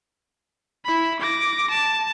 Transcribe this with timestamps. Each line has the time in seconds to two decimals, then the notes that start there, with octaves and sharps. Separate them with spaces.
0.85 E4 B5
1.21 D6 A#6
1.71 A5